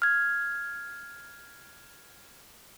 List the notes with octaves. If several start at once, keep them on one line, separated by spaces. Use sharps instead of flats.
F6 G#6